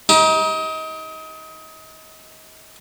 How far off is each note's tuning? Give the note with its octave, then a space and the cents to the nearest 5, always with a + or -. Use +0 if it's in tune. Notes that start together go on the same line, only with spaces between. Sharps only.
D#4 +30 G4 +0